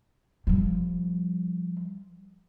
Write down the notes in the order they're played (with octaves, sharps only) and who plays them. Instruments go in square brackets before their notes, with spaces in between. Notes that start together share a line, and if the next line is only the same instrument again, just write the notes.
[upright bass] F3 G3